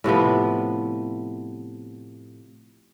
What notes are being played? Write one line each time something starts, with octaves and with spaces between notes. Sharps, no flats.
A2 C3 F3 B3